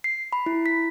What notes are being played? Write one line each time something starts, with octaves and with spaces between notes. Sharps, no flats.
C7
B5
E4
B6